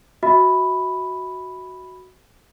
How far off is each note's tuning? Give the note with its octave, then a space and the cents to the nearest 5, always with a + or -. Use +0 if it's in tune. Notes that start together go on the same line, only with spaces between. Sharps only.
F#4 +0 E5 -35 B5 +0